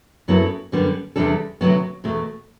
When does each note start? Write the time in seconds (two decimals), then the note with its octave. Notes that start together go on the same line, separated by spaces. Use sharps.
0.28 F#2 F#3 B3 E4 A4
0.72 F#2 D3 G3 B3
1.16 E2 C3 G3 D4 A4
1.61 D2 C3 F#3 B3 F#4
2.04 E2 B2 A3